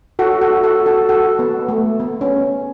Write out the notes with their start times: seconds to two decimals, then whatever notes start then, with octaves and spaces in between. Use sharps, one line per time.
0.19 F#4 A4
0.41 F#4 A4
0.63 F#4 A4
0.86 F#4 A4
1.09 F#4 A4
1.39 B3
1.69 A3
2.00 B3
2.21 C#4